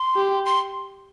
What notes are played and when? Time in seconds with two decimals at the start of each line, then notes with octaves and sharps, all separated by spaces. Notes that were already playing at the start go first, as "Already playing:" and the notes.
Already playing: C6
0.16 G4
0.46 C6